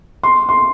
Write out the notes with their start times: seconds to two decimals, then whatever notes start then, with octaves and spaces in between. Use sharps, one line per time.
0.23 C6
0.49 C6